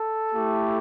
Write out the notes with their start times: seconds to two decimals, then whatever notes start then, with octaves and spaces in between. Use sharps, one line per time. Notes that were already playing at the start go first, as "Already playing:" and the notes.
Already playing: A4
0.30 A3 E4 G4